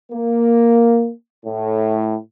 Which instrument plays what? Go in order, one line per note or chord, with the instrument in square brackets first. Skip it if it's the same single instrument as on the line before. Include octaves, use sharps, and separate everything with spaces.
[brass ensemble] A#3
A2